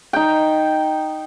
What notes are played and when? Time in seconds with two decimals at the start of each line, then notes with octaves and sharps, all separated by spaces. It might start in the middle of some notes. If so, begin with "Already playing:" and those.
0.13 D#4 G5